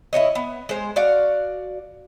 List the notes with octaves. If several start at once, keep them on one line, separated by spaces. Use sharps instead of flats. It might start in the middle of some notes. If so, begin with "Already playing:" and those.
E4 F#4 C#5 D#5
B3
G#3 C5
F#4 D5 F5